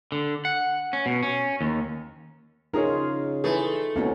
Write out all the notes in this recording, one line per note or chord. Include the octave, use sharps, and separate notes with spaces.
D3
F#5
C#4
B2
C#4
D#2
C#3 C#4 D#4 F4 G#4 A#4
E3 A3 G#4
E1 D#2 C4 C#4 F#4